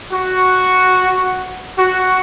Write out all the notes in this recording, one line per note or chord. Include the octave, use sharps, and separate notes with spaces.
F#4
F#4